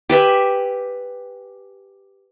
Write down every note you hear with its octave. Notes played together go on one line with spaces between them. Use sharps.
G4 B4 E5 G#5